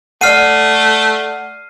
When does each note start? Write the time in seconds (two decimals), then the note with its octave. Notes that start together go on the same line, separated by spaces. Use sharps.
0.21 A3 D5 F#5 F6 C7 D#7